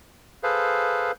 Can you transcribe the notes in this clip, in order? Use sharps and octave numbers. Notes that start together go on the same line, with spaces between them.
G#4 A4 B4 C5 F5